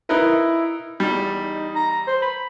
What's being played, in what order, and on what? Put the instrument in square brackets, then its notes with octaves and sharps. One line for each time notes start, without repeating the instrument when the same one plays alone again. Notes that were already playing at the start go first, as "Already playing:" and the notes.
[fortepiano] D#4 A#4 B4 [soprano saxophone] E4
[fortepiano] E2 G3 [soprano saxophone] D#4
[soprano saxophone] A#5
C5
B5